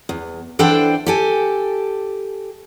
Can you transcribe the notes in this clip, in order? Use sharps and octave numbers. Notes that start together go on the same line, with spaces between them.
E2
E3 D4 A4 C5 F#5 G5
G4 A4 G#5